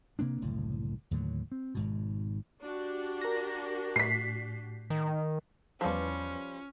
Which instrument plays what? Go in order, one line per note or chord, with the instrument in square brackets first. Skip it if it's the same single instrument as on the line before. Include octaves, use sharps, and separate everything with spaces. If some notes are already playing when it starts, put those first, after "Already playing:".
[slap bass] C3 A#3 C4 D4
F#1 C2 A2 D3
D#2 A2 D3 F#3
C4
G#1 G#2 B2
[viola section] D4 F#4 G4
[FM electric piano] A#4 A#6
[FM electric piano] A2 [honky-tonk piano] B6 C7
[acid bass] D#3
[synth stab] E2 B4 [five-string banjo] F3 G3 [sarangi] C#4